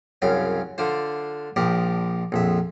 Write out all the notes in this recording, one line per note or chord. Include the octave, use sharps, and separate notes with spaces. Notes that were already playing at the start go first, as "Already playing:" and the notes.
C2 F#2 C#3 F5 G5
D3 D4 F4 C5
A#1 F3 G4 A#4 D5
A#1 F2 E5